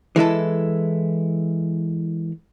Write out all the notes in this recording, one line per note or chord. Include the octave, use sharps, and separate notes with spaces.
E3 G#3 E4 A4